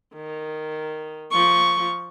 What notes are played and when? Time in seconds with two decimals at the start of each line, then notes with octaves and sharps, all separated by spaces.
0.15 D#3
1.31 F3 C#6